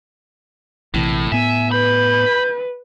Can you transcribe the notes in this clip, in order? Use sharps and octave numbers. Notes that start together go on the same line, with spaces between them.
A#1 A2 C3 E3
A2 B3 E5 G#5
B4 B5 G6